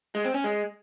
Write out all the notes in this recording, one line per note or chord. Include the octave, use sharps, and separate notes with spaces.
G#3
C4
C#4
G#3